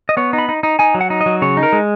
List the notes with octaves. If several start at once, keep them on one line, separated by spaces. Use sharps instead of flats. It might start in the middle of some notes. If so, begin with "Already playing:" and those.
D#5
B3 C#5
D#4
B5
D#4
D#4
D#4 G#5
F#3
F#5
D#4
D#5
F#3
C#3 C#5
D#4
A#4
G#3